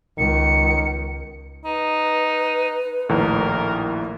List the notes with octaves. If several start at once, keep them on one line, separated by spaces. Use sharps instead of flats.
C#2 D#3 C#7
D#4 B4
A#1 D#2 A2 A#4